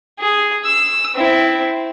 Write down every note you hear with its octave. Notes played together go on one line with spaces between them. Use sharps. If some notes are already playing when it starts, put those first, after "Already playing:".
G#4
E6
C4 E4